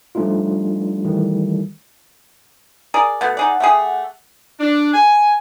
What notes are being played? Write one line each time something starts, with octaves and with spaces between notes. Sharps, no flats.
F3 G3 A3 D4 D#4 F4
D#3 E3 G3 A3
G#4 A#4 D5
B2 A3 F#5
D#4 G#4 D5
A3 G4 G#4
D4
G#5